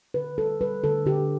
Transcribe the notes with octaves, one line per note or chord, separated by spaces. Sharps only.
D3 B4
G3 A4
G3 B4
D3 A4
D3 G4